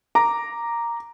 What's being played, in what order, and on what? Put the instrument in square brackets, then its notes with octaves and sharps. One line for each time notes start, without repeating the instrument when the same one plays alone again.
[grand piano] A#5 D6